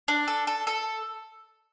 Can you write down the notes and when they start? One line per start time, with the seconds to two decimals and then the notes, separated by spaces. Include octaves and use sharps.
0.08 D4
0.28 A4
0.47 A4
0.67 A4